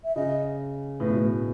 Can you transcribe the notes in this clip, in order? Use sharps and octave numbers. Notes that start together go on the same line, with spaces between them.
E5
C#3 D#5
A2 B4
B2
A2